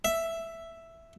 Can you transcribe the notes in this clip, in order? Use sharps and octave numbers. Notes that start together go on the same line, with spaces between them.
E5